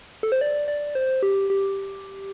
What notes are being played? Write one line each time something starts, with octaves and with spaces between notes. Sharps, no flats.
A4
C5
D5
D5
C5
G4
G4